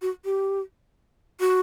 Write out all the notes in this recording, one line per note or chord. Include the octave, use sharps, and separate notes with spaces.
F#4
G4
F#4